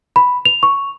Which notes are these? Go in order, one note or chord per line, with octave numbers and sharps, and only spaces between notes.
B5
F7
C#6